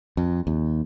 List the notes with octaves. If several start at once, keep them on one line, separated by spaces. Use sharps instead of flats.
F2
D#2